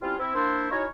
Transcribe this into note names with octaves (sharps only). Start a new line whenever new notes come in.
G3 C4 C#4 E4 F4
C4 E4
A#3 D4 E4 C5
C#4 D#4 E4 F#4 A#4 C#5